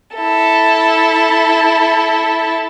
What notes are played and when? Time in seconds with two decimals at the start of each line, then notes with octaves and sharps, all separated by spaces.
0.16 E4 A4